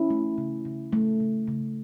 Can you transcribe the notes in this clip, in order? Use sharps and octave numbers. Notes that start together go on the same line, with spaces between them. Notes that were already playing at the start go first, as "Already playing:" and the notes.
Already playing: C#4 E4
A3
C#3
C#3
A3
C#3
C#3